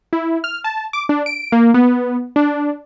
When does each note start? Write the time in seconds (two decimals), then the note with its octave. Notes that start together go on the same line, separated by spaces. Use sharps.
0.13 E4
0.44 F6
0.64 A5
0.93 D6
1.09 D4
1.26 D7
1.52 A#3
1.74 B3
2.36 D4